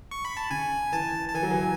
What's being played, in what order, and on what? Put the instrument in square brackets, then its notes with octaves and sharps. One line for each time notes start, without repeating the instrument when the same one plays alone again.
[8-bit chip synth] C#6
B5
A5
[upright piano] C#3 [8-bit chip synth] G#5
[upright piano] E3 [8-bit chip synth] A5
[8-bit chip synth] A5
[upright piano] E3 [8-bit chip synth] G#5
[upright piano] F#3
E3